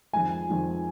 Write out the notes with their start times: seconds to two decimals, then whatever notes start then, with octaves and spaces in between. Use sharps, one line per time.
0.13 F2 D#3 G#3 G#5
0.49 F2 D#3 G#3